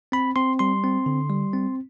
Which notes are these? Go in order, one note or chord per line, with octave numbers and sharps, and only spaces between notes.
C4 B5
C4 C6
G3 C6
C4
D3
G3
C4